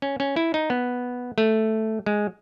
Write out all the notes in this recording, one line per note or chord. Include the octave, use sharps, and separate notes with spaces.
C#4
C#4
E4
D#4
B3
A3
G#3